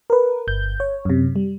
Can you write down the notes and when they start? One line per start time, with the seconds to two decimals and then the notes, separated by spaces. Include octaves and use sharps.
0.10 A#4 B4
0.47 G1 G6
0.80 C#5
1.05 F#2 C3
1.36 G3